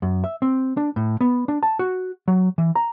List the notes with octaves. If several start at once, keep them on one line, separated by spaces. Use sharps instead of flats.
F#2
E5
C4
D4
A2
B3
D4
A5
F#4
F#3
E3
A#5